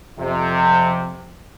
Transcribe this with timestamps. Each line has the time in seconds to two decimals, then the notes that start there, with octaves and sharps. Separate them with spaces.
0.18 F2 C3